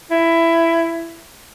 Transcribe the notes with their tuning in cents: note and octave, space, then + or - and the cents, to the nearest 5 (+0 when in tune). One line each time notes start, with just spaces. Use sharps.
E4 +15